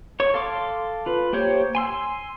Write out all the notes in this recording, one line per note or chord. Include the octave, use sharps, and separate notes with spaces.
C#5 C#6
A4 F5 C6 D6
F4 B4
A#3 G4 C5 C#5
G#5 C6 E6